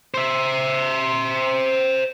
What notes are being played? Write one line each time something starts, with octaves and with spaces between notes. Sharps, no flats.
C5 E5